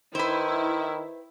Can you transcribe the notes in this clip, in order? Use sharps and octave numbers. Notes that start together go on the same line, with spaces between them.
D#3 E4 B4 C5